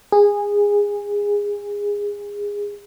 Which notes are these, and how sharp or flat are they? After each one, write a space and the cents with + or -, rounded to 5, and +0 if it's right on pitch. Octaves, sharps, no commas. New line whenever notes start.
G#4 -20